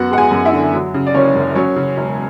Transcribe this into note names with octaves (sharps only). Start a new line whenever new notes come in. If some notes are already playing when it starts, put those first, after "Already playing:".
Already playing: F#2 B3 F#4 F#5
G#3 F#5
G#4 G#5
F#2
E4 E5
D3
F#3
C#3
D5
F#1 C#4 C#5
F#2
F#3 C#4 C#5
C#3
E1